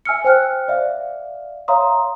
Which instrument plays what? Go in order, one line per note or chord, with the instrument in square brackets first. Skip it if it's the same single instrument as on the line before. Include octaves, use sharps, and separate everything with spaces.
[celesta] E5 G#5 E6 F6 C#7
C5 G5 F6 F#6
D5 E5 F5
C#5 E5 F5 A#5 C6 D#6